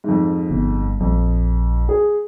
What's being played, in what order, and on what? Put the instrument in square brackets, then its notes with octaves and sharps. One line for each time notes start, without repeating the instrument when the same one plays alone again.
[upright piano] F2 G#2
[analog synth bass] G1
[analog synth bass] A#1 [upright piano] F2
[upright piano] G#4